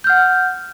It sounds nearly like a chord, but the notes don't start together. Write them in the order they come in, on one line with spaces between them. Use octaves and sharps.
G6 F6 F#5